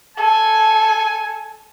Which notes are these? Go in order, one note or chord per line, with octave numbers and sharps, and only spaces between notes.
A4 G#5